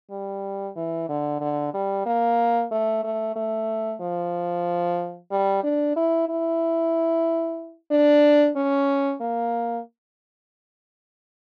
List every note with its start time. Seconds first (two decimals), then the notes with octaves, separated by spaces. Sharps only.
0.11 G3
0.76 E3
1.09 D3
1.41 D3
1.74 G3
2.06 A#3
2.72 A3
3.04 A3
3.36 A3
4.01 F3
5.31 G3
5.64 D4
5.96 E4
6.29 E4
7.91 D4
8.56 C#4
9.21 A#3